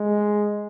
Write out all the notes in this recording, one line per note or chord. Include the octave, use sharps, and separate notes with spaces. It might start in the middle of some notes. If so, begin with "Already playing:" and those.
Already playing: G#3